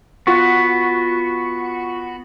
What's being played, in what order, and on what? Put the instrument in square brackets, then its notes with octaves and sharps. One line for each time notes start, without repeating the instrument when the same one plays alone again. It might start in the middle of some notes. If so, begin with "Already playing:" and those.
[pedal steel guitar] B3 F#4 [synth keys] F4 C#6